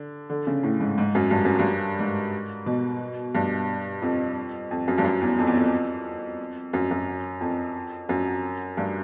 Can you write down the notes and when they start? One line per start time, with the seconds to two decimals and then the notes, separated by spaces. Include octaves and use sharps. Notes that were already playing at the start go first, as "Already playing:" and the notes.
Already playing: D3
0.30 D3
0.47 C#3
0.63 A2
0.80 G#2
0.98 G#2
1.15 F#2
1.31 G2
1.45 F#2
1.59 G2
1.99 G#2
2.66 B2
3.35 G2
4.02 F2
4.71 F2
4.88 F#2
4.98 G2
5.04 F#2
5.21 E2
5.39 F2
5.47 E2
5.56 F2
6.73 F#2
6.91 F#2
7.41 F2
8.09 F#2
8.77 G2